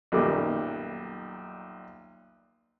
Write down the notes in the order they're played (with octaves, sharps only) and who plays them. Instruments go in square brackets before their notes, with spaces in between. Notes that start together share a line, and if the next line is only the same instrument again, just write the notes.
[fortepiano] B1 F#2 A#2 D#3 G3 D6